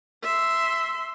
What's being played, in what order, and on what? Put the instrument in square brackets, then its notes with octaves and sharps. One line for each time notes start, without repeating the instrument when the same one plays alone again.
[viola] E5 C6